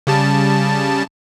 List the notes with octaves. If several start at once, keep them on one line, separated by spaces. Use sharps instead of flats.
C#3 G3 A5